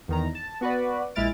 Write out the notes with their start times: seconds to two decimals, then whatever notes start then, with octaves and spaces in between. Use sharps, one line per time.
0.08 E2 D#3 A#5
0.35 A5
0.61 B3 F#4 B4 D5
1.15 A#1 G#3 E4 F6 A6 D7